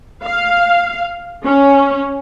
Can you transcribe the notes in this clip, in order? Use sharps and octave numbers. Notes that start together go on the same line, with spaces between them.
F5
C#4